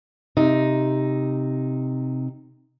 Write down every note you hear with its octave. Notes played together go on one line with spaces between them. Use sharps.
C3 D#4